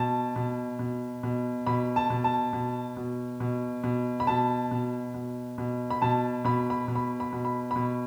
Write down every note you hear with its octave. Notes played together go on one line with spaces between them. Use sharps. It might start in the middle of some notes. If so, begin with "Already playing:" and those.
Already playing: B2 A5
B2
B2
B2
B2 B5
A5
B2
A5
B2
B2
B2
B2
B5
B2 A5
B2
B2
B2
B5
B2 A5
B2 B5
B5
B2
B5
B5
B2
B5
B2 B5